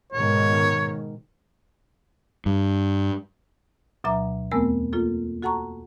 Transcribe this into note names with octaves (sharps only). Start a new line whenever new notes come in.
G#2 B2 D#3 C#5
G2
D2 B2 F#3 E5 A#5 D6
E2 A3 B3 C4 A#4 E6
A#3 F4 A4
F#4 A4 F#5 A5 A#5 C#6